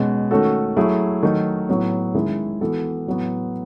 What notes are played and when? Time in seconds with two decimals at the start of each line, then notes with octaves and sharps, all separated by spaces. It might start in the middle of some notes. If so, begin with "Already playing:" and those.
Already playing: B2 G#3 C#4
0.31 D#3 A3 C#4 F#4 A4
0.77 F#3 A3 E4 G#4
1.23 D#3 F#3 A3 D#4
1.69 A2 F#3 B3
2.14 D#3 G#3 C#4 E4 G#4
2.61 E3 B3 F#4 A4
3.06 A2 F#3 B3